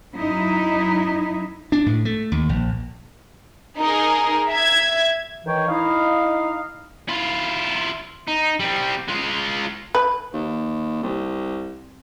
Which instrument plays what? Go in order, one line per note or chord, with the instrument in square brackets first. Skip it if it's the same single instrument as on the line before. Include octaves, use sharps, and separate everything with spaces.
[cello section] F#2 D#4 E4
[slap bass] D4
A2
A3
D#2
A#1
[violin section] D#4 G#4 A#4
E5 G#6
[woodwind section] D#3 E3 C#5 G5
D#4 E4 D#5 F5
[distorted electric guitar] E4 F4
D#4
G3 C4
G#3 F4
[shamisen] B4
[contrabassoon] D#2
C2